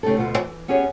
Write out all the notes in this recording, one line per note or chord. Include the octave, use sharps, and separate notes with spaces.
C#3 A3 D#4 G4 A4
D2 B2 F4 F5
E3
B3 C#4 G4 G#4 C#5